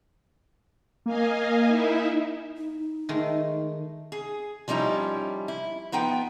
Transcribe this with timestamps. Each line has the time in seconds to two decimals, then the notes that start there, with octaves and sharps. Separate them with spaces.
1.06 A#3 D#5 F5 G#5
1.67 D#4 E4 E5
2.58 D#4
3.09 D#3 G#3 A3
4.12 G#4
4.68 F3 G3 C#4 D#4 E4
5.48 E4
5.92 F3 B3 D#4 G5